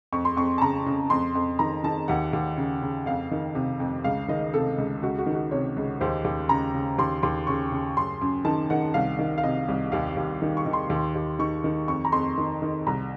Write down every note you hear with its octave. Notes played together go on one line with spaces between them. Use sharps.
F2 C#6
C6
F2 C#6
A5
C#3 A#5
C#3
F2 C6
F2
D#3 A#5
D#3 A5
D#2 F#5
D#2
C#3
C#3
F2 F5
D#3
C3
F2
C#2 F5
D#3 D#5
C3 A4
C#2
C#2 F#4
F#4
D#3
F#4
C3 C#5
C#2
D#2 C5
D#2
C#3 A#5
C#3
D#2 C6
D#2 C6
C#3 C#6
C#3
F#2 C6
F#2
D#3 A5
D#3 F#5
C2 F5
D#3
F5
C3 D#5
C2
D#2 F5
D#2
D#3
C#6
D#3
C6
D#2
D#2
D#3 C#6
D#3
F2 C#6
A#5
F2 C6
D#3
D#3
C2 A#5